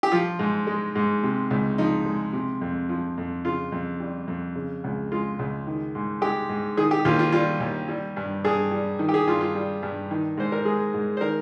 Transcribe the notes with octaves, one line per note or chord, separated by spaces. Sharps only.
G4
F3 F4
G#2
G#3
G#2
C3
C#2
F3 D#4
G#3
C3
F2
F3
F2
C#3 F4
F2
G3
F2
C#3
C#2
G#3 F4
C#2
D#3
G#2
G#3 G4
G#2
D#3 G#4
G4
D#2 F4
F4
G3 F4
D#2
G3
G2
G2 G#4
G3
D#3
G4
G#4
G2 F4
F4
G3
G2
D#3
G#2 C5
A#4
G#3 G#4
G#2
C5
D#3 A#4